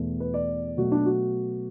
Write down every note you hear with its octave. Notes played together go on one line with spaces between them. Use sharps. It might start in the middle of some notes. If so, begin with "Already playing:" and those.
Already playing: E2 B2 A3
B4
D5
B2 F#3 A3 F#4
D4
F#4